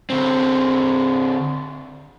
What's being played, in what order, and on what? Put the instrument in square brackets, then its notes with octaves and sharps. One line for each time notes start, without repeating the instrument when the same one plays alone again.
[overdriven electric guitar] D3 C4